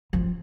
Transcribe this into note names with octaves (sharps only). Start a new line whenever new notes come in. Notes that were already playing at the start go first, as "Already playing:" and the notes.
F3